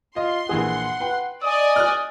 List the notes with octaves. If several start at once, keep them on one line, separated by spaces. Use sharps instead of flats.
F4 D#5 C6
A#1 E3 G#4 F#5
B4 G5
D5 D#5 G#5 D#6
F6 F#6